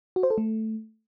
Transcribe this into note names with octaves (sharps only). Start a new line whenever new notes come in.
F#4
C5
A4
A3